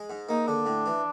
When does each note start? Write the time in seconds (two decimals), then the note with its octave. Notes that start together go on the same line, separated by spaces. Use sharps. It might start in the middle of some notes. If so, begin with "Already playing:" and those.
Already playing: G#3
0.10 G#2
0.29 A#3 D#4
0.47 D3 D4
0.66 A2
0.86 E3